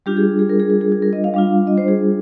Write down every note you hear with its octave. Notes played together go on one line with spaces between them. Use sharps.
G3 D4 F4 G4
G#4
G#4
A#4
G#4
A#4
G#4
G#4
A#4
D#5
F5
G3 D4 F4
D#5
C5
G#4